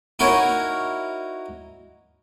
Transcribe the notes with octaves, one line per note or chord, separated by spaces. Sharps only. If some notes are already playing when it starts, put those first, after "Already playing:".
D#4 E4 F#4 A#4 C#5